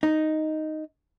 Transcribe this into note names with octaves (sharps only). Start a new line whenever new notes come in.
D#4